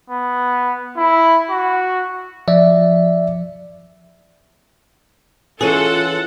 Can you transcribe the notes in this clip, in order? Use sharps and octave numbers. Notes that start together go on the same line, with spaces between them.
B3
E4
F#4
F3 D5 E5
E3 C#4 F4 G#4 A4 F#5